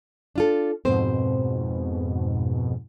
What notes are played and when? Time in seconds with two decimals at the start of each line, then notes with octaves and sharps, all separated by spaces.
0.36 D4 F4 A4
0.85 F2 G#2 B2 C4 C5